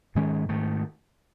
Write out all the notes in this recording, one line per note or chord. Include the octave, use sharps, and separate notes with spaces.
G#2 D#3 G#3 C#4
G#2 D#3 A3